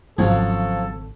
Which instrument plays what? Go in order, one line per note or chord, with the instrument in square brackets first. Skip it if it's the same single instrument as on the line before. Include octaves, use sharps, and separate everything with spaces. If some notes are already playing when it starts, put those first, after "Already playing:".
[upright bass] G#1 [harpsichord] C#3 F3 F#3 [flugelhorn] A4